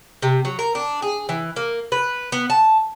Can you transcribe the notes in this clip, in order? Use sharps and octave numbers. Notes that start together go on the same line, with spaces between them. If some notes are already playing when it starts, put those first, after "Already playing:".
C3
F#3
A#4
D4
G#4
E3
A#3
B4
B3
A5